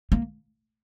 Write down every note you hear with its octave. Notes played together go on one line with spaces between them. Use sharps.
A#3